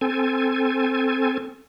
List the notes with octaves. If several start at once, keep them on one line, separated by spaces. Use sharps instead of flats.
C4 A4 G#5